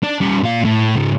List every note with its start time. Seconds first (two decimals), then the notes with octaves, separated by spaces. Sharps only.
0.03 D4
0.21 G3 C#4
0.43 A#2 F5
0.65 A2
0.96 G#2 C#3